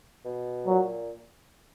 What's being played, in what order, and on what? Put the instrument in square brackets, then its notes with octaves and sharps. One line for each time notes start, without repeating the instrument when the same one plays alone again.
[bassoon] B2
[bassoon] A#2 [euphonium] F#3